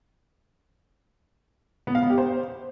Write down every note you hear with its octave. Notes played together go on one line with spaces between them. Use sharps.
B3
F5
B3
G4
C5